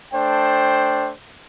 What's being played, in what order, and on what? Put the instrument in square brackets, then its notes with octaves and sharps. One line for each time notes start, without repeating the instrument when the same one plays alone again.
[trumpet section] A3 D4 C5 G5